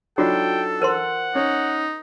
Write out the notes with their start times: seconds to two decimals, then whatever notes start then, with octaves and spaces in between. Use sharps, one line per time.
0.18 F#3 D4 D#4 F4 F#4 A4 G5
0.82 A#4 C5 F#5 C6
1.35 C#4 D#4